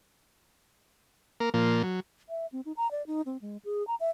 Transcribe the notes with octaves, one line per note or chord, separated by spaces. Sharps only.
A#3 A#4
A#2 F3 A#3
F#3
E5
C4
D#4
A#5
D5
D#4
C4
G#3
G#4
A#5
E5